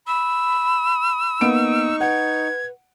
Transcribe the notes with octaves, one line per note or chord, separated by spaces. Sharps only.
B5 E6
A#3 B3 D#4 C#6 D7
B4 F#5 G#6